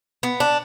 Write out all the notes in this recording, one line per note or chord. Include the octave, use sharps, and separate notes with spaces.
B3
D4